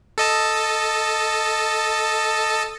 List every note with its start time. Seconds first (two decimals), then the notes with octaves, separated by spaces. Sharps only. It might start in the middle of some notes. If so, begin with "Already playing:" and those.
0.18 A4 D#5 A5